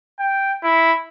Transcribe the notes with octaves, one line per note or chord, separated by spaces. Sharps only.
G5
E4